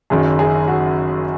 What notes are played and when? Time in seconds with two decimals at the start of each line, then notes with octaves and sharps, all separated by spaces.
0.10 F#1 F#2 D#3 F#3 G#4
0.39 G#4
0.68 F#4